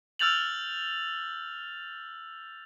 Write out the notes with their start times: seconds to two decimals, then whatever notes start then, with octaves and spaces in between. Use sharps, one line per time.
0.19 E6 F6 G6 A6 F7 F#7